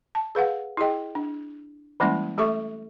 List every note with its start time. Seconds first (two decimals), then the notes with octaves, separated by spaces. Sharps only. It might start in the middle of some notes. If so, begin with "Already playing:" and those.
0.15 A5
0.35 G#4 B4 F5 F#5
0.77 E4 G4 G#4 D#5 G5
1.15 D4
2.00 E3 G3 G#3 A#3 C#4 E4
2.38 A3 G4 A4 E5 C#6